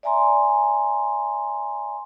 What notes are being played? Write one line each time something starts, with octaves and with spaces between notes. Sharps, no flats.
D5 E5 G#5 A#5 C6